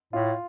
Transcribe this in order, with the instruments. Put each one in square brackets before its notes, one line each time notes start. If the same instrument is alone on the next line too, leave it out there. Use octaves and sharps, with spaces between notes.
[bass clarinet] A2 [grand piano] F4